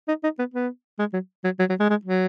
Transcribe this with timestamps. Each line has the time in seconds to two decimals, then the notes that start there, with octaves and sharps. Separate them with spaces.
0.08 D#4
0.24 D#4
0.39 B3
0.54 B3
0.99 G#3
1.14 F#3
1.45 F#3
1.60 F#3
1.70 F#3
1.80 G#3
1.90 G#3
2.05 F#3